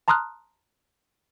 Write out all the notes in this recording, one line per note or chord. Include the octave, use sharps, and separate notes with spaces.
A5 A#5 C6 D#6 F6 F#6